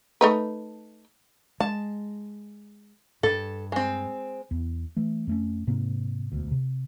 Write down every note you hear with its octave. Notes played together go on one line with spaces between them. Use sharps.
A3 D#4 B4
G#3 A5
G2 A4
G#3 C4
E2
E3 A3
F2 A3 C#4
G#2 C3 A#3 C4
E1 D2
C3